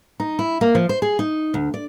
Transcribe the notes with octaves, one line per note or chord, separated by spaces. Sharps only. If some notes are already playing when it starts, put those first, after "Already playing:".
D#4
E4
A#3
F3
C5
G#4
D#4
D2
D5